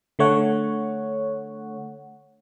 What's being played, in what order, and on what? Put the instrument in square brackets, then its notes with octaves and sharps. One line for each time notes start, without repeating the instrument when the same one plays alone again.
[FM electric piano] D3 A3 C#5 F#5